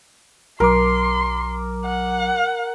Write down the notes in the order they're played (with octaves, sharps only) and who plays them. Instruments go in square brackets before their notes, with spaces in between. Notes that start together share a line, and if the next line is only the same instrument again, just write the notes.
[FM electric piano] B1 F#3 D6 [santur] A#4 [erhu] C6
[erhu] F#5